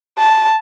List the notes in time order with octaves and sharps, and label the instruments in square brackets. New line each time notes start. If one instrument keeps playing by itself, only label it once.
[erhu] A5